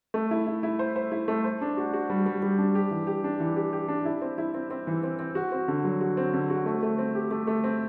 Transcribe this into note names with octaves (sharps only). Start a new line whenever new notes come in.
A3
E4
E4
E4
C5
C5
E4
A3
C5
D4
F#4
F#4
G3
G3
G3
D4
G4
E3
G4
D4
E3
G4
G4
D4
E4
C4
E4
C4
C4
E3
C4
C4
F#4
C4
D3
F#3
F#4
C4
D3
F#4
A3
A3
C4
G4
A3
A3
C4